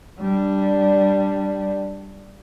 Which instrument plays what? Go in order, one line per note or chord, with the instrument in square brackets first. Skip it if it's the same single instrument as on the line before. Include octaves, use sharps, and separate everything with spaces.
[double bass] G3 D4